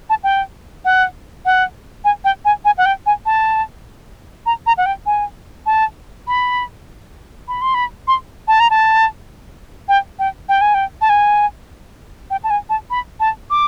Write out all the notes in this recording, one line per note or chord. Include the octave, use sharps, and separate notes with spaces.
A5
G5
F#5
F#5
G#5
G5
G#5
G#5
F#5
G5
G#5
A5
A#5
A#5
F#5
G5
G#5
A5
B5
B5
C6
B5
C6
A5
A#5
A5
G5
G5
G5
G#5
G5
A5
G#5
G5
A5
G#5
A5
B5
A5
D6